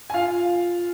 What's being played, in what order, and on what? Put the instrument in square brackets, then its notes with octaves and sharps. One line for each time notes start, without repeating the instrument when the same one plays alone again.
[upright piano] G#5
F4 F5